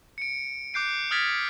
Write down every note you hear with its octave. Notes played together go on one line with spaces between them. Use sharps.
C#7 D7
D6 F#6 G6 C7 D7
D#6 F6 G#6 A6 B6 D7